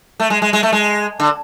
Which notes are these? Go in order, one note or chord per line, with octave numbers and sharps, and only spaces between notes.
A3
G#3
G#3
G#3
A3
G#3
D3